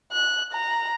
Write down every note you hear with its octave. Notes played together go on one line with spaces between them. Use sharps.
F#6
A#5